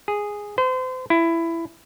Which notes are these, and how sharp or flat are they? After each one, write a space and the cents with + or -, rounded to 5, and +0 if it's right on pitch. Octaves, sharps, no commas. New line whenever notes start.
G#4 -5
C5 -35
E4 +15